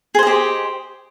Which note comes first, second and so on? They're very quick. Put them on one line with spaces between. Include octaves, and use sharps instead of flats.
G#4 C5 D#5 G4